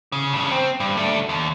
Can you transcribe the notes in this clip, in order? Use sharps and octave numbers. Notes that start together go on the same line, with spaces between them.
C#3
G2 C#3
C4
G2
A3 D4
D#2